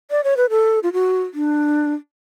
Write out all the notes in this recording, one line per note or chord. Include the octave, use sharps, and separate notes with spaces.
D5
C#5
B4
A4
F4
F#4
D4